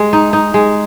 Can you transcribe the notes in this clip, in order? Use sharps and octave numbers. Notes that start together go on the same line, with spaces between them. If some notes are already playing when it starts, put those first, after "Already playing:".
Already playing: G#3
D#4
D#4
G#3